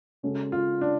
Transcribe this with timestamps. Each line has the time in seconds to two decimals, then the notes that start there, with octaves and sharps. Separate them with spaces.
0.23 C#3 G#3 C#4 F#4 A4
0.52 F4
0.81 D4